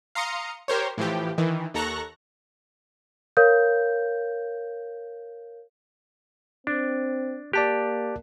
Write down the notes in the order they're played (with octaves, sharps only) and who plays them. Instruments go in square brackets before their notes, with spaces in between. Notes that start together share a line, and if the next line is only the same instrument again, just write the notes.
[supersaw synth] F5 A#5 C6 D#6 C#7
G4 A#4 C5 C#5
A2 E3 F3 G4
D#3 E3
D#2 A4 A#5 C#6 F#6 A#6
[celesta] A#4 C#5 F5 G6
[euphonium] C4 [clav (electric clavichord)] D4
[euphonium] A#3 [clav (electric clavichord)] G4 [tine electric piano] D5 A5 F#6